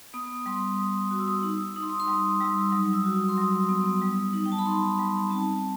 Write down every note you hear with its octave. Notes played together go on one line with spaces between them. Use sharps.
B3 D#6
G3 C6
G3 D#6
F#4 D#6
E6
D#6
D#4 E6
D#4 D#6
C6
D#6
C6
G3 D#6
G3 E6
E6
F#3 D#6
D#6
E6
F#4
D#6
C6
F#3 D#6
B3
G3
D#4
G5
A5
B5
D#4 C6
G3 B5
C4 A5